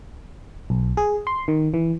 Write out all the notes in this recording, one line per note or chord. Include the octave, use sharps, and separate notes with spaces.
B1
G#4
C6
D#3
E3